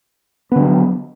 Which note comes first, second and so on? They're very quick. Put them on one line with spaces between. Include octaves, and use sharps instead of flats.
B3 D3 F#3